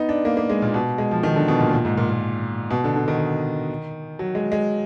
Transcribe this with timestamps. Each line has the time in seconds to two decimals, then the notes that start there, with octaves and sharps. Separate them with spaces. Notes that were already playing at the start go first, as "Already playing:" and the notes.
Already playing: B3 D#4
0.09 D4
0.25 A#3
0.37 A#3
0.49 G#3
0.62 A#2
0.74 B2
0.98 G#3
1.11 F3
1.23 D#3
1.36 D3
1.48 B2
1.60 A#2
1.73 A#2
1.85 G#2
1.97 A#2
2.10 A#2
2.71 B2
2.84 D3
2.96 D3
3.08 D#3
4.19 F#3
4.35 G#3
4.52 G#3